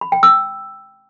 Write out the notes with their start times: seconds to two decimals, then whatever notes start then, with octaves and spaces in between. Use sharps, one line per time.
0.01 B5
0.12 G5
0.23 E6